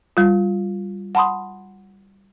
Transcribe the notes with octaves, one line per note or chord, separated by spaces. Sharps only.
G3 F4
F#5 A5 B5 C6 D#6